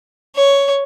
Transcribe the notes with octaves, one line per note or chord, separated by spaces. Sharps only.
C#5